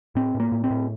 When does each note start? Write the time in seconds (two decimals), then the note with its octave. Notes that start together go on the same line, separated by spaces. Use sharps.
0.15 A2 C4
0.35 A2
0.40 A#3
0.52 A2
0.64 C4
0.70 A2